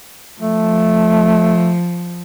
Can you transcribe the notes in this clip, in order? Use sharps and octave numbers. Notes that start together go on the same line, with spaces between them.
F3 A3